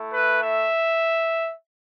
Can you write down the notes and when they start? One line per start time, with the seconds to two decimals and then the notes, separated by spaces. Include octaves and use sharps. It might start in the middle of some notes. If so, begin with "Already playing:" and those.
Already playing: A3 E4
0.12 B4
0.42 E5